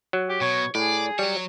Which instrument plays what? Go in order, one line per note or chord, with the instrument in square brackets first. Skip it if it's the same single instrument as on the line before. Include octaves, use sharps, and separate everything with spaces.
[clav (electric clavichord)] F#3
[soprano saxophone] G4
[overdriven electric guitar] B2 [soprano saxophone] C#5
[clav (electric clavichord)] A2 [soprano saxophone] G#4 [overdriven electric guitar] D5
[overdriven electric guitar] F#3 C#5 [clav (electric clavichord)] G3